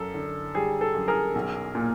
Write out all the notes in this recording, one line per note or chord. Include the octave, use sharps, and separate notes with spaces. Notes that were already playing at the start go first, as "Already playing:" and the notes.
Already playing: F#2 A4
D3
G3 G#4
A4
F#2
G#4 A#4
B1
A#2